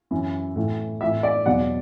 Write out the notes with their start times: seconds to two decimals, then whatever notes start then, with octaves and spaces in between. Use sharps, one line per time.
0.11 F#2 E3
0.56 A2 E3
1.01 A2 E3 E5
1.23 D5
1.46 E2 B2 F#3 D5 F#5